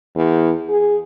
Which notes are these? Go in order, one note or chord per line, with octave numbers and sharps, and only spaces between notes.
E2
G#4